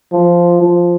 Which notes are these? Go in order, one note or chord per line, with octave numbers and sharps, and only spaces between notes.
F3
F3